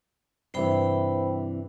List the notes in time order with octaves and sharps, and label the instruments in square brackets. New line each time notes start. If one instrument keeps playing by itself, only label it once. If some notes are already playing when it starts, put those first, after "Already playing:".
[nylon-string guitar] G2 C3 E3 [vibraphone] C5 G5 B5